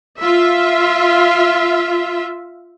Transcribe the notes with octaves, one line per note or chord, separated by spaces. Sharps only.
F4 E5